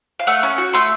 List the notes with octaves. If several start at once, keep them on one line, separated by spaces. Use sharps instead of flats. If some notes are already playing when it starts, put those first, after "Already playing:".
F5
A3 F#5
C#4
F#4
A3 C6